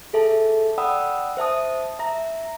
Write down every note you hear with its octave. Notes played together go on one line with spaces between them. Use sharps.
G#4 A4 E5 A5
D5 F#5 G5 B5 D#6 E6
C5 E5 A5 D#6
E5 A#5 A#6